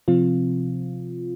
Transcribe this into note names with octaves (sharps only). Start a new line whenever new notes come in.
C3 F3 C4 F4